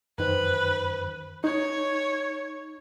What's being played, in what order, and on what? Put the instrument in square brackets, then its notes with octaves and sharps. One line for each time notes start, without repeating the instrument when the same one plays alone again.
[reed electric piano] F#2 D#3 C5 [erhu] B4
[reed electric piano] D#4 [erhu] C#5